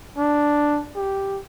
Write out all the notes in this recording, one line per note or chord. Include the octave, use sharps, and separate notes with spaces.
D4
G4